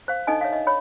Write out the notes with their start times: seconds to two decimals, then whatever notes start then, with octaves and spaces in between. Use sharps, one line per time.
0.08 C5 F5
0.27 D4 D#4 A4 D#5 G#5
0.41 C#5 E5 F5
0.53 D#5
0.67 C#5 B5